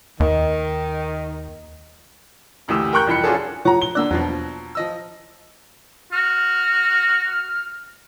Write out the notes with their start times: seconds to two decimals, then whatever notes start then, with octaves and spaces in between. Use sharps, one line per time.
0.20 D#2 D#3
2.68 F#1 D2 E3 G4 D#6 E6
2.93 A#4 G5 A#5 C#6 F#6 G6
3.07 C2 F2 E3 G5 B5 C#7
3.24 C#4 D4 F4 F#4 G#4 A4
3.65 F3 C#5 F#5 A#5
3.82 G7
3.95 D3 A#3 D4 D5 E6 F#6
4.11 E2 B2 F3 F#3
4.75 F3 D#5 E6
6.12 F#4 F6